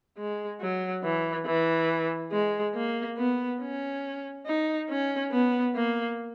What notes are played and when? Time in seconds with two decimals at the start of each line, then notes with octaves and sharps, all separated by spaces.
0.17 G#3
0.60 F#3
1.03 E3
1.46 E3
2.32 G#3
2.74 A#3
3.17 B3
3.61 C#4
4.46 D#4
4.89 C#4
5.32 B3
5.75 A#3